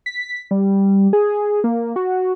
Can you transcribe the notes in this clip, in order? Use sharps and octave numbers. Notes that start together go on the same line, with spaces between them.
B6
G3
G#4
A#3
F#4